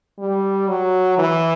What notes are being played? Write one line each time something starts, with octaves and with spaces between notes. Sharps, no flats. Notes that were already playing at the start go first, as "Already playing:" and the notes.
G3
F#3
E3